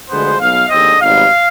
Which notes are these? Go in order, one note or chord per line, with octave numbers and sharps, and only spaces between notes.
D2 D3 F3 G#3 B3 C5
B1 B2 B3 F5
D#2 D3 G#3 C4 D#5
G#1 G#2 G3 B3 F5